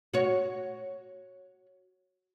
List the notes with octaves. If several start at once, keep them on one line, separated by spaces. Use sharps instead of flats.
F#4 C#5